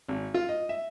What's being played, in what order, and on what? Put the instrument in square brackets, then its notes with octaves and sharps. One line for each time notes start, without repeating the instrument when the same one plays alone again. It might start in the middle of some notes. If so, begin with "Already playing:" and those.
[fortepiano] G#1
F4
D#5
E5